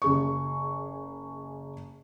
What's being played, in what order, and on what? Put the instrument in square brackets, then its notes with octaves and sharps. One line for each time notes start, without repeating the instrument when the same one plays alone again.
[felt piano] F#1 G#4 C#6